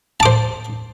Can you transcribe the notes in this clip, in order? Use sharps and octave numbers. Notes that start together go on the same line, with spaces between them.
C5 A5 D6